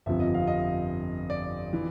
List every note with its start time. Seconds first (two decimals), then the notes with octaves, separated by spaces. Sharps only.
0.06 G1 F2 C3 F3 E5
0.20 D#5
0.34 F5
0.47 D#5
1.30 D5
1.73 E3